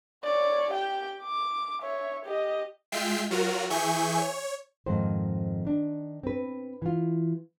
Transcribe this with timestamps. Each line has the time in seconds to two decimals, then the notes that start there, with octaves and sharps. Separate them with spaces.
0.24 C#5 D5
0.70 G4 G5
1.23 D6
1.82 C#5 E5
2.25 G4 D#5
2.92 G#3 F4 E5 G5 C7
3.30 F#3 F4 F#4 A#4
3.70 E3 G#4 E5 G#5 C#6 G6
4.18 C#5
4.86 F2 G#2 D#3 C5
5.65 D#3 D4
6.23 C4 B4
6.82 E3 F4